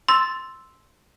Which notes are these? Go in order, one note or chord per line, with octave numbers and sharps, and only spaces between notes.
C6 E6 A6